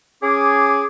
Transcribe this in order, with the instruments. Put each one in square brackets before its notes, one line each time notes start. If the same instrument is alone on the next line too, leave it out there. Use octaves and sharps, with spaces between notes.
[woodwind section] C#4 G#4 D6